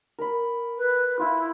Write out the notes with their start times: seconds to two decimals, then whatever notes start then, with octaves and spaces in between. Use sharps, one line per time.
0.19 A#4 B5
0.78 B4
1.19 E4 F4